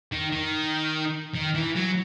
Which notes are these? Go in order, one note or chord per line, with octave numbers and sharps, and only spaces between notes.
D#3
D#3
D#3
E3
F#3